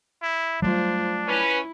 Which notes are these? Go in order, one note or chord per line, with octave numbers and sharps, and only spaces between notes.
E4
F#3 G3 A3 D4 F4 C5
C#4 E4 B4